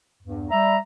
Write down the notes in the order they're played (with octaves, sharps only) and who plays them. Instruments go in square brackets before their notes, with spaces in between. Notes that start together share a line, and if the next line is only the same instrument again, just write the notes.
[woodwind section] E2 G2
[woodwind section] G3 E5 [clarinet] A#5